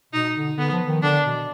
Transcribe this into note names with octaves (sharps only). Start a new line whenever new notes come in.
B2 D#4
D3
D3 B3
F3
D#3
D3 D4
B2